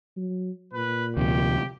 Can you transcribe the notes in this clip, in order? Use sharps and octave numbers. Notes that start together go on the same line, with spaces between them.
F#3
A#2 B4
D2 C3 F3 G4